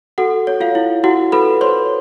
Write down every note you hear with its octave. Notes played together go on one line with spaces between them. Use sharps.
F#4 A4 F#5
C#5
F4 F5
E4
E4 F#4 F#5
A4 B4 B5
C5 C#5 C6